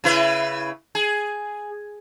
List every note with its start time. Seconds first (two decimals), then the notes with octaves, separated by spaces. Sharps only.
0.04 C#3 E4 B4
0.95 G#4